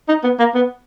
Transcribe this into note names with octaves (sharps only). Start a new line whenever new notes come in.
D#4
B3
A#3
B3